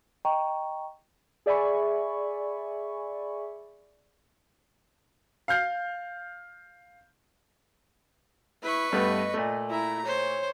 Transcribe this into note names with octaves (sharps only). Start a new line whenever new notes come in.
D#5 G5 A#5 C#6
G#4 D5 E5 G#5 B5 C#6
F5 F6 G6 C7
E4 B4 C#6
G2 A3 B3 D#5
A#2 A3
E4 A#5
C5 C#5